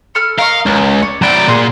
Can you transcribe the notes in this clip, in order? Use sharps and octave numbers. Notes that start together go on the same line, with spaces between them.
A4 B5 F6
A#4 D#5 F5 C#6
C#2
C#5 D5
F#3 C4 E4 D5 G5
A#2 G#4 F#5 C6